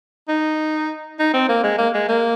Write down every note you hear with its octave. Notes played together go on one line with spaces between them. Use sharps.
D#4
D#4
C4
A#3
G#3
A#3
G#3
A#3